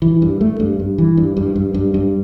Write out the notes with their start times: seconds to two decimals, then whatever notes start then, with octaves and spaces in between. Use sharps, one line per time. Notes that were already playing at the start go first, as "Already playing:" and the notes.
0.02 E3
0.22 G2
0.41 A3
0.60 G2
0.80 G2
0.98 E3
1.17 G2
1.37 G2
1.56 G2
1.74 G2
1.94 G2